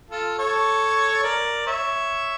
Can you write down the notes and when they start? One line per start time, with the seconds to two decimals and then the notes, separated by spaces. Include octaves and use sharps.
0.10 F4 A4
0.39 A4 C#5
1.24 A#4 D5
1.66 C#5 E5